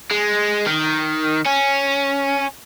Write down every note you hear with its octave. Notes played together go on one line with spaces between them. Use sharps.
G#3
D#3
C#4